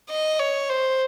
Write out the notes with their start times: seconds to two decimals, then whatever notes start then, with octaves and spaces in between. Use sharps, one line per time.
0.10 D#5
0.39 C#5
0.69 C5